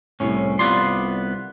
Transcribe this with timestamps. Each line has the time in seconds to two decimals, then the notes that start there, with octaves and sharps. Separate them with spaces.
0.20 C2 A2 C#4
0.59 C2 B3 F4 D5 C6